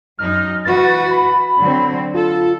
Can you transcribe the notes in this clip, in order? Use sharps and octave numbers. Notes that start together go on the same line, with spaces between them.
F#2 D#4 F6
E3 F#4 B4 A6
B5
D3 F#3 C4
F4 A4